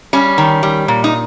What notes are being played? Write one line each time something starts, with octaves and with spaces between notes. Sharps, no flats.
G3 C#4
D#3
G3
A#2
D#4